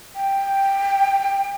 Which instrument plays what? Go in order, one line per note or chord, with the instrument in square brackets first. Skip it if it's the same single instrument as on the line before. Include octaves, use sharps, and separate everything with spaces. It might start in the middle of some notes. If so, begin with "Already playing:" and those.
[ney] G5